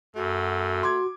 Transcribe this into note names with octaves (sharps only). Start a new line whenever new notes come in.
F#2 A3 F#4
C6 D6 G#6